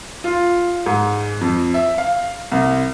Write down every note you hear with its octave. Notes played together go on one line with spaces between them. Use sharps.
F4
G#2
F2
E5
F5
C2